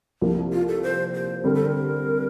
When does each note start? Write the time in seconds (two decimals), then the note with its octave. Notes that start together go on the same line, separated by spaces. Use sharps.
0.21 C2 C3 F3 A#3
0.52 F4
0.68 A4
0.83 C5
1.14 C5
1.44 D3 G3 C4 A#4
1.55 A4
1.65 A#4